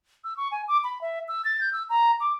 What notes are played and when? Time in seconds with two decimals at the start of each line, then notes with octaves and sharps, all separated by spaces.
0.24 E6
0.37 C#6
0.51 G#5
0.68 D6
0.84 B5
1.01 E5
1.28 E6
1.45 A6
1.61 G6
1.73 E6
1.89 A#5
2.20 D6